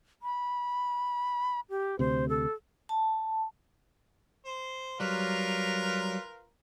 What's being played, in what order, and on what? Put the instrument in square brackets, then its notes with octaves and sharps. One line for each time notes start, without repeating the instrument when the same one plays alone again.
[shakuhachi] B5
G4
[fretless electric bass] D2 C3 [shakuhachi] C5
[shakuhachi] A4
[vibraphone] A5
[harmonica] C5
[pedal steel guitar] F#3 G3 [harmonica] F4 A#4 B4